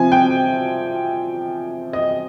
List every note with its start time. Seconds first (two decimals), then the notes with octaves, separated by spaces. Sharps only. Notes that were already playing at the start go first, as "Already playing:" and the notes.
Already playing: C3 F3 C4 G#5
0.12 G5
1.93 D#5